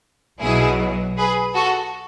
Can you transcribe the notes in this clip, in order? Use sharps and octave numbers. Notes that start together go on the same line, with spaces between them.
B1 B2 F#3 E4 G#4
G#4 B4
F#4 A4